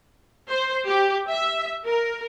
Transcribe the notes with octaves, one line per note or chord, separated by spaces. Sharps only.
C5
G4
E5
A#4